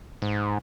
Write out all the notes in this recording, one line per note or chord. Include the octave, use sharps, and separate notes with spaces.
G#2